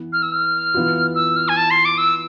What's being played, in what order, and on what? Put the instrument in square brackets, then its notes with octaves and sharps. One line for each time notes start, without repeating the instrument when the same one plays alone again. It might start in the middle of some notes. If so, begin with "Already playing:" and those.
Already playing: [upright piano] E3 B3
[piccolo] F6
E6
F6
[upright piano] E3 B3 F4
[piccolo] E6
F6
G#5
A5
C6
D6
E6